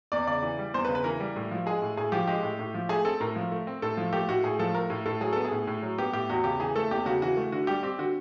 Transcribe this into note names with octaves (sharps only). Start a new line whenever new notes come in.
E2 D5
C#3 D5
E3
G3
E2 C5
B4
C#3
B4
E3 A#4
G3
A2
F3
G#3 G#4
A2
A2 G#4
F3 G4
G#3 G4
A2
A2
F3
A3 G#4
C4 A4
A2 A#4
F3
A3
C4
A2 A4
F3
A3 G4
A2 F#4
A2 G#4
F3 A4
A3 A#4
A2
A2 A4
F#3 G#4
B3 A4
G#4
A2
A2
F#3
B3 G4
A2 G4
E2 F#4
C#3 G4
E3 G#4
A3 A4
E2 G4
C#3 F#4
E3 F#4
A3
D3 F#4
G3 G4
C4 G4
D3 F#4